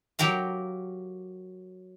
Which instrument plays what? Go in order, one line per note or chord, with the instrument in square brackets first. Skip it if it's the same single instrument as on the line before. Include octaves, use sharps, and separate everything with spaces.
[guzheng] F#3 G4 A#4 F5